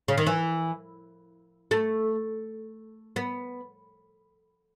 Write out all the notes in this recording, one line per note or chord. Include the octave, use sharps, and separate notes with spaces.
C#3
D#3
E3
A3
B3